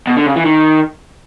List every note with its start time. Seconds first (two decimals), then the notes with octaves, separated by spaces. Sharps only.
0.07 B2
0.17 D3
0.26 C#3
0.36 E3
0.46 D#3